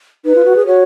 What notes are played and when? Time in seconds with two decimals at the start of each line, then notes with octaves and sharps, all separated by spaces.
0.25 D#4 B4
0.35 F4
0.45 F#4
0.56 G#4
0.66 F#4 C#5